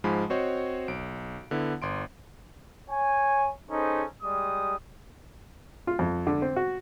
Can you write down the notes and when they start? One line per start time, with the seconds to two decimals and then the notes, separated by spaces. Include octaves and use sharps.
0.04 G#2 F3 G#3 G#5 B5
0.30 C4 F#4 C5 C#5 D#5
0.88 B1 D7
1.51 D3 B3 E4
1.82 G1 C6 D7
2.89 C#5 G#5
3.70 C#4 D#4 G#4 A4 C5
4.23 G3 G#3 G4 D#6
5.87 F4
5.99 F2
6.27 D3
6.42 C4
6.56 F#4